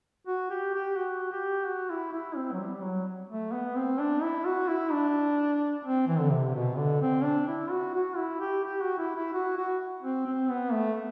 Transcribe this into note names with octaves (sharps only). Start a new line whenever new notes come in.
F#4
G4
G4
F#4
G4
F#4
E4
E4
C4
F#3
G3
F#3
A3
B3
C4
D4
E4
F#4
E4
D4
C4
E3
D3
C3
B2
D3
C4
D4
E4
F#4
F#4
E4
G4
G4
F#4
E4
E4
F#4
F#4
C4
C4
B3
A3